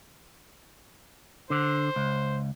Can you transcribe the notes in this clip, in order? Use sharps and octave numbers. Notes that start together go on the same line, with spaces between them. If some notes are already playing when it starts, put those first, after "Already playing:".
D3 C5
C#2